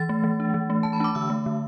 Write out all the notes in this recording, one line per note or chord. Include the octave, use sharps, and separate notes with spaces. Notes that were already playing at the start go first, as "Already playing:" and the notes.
Already playing: E3 A6
A3
E3
D4
E3
A3
E3 A5
B5
D4 D6
D3 E6
A3
D3